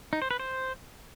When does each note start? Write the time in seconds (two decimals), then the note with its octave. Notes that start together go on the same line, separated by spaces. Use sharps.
0.13 D#4
0.22 C5
0.31 B4
0.40 C5